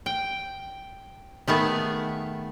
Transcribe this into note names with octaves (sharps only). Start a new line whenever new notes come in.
G5
D#3 A3 B3 G#4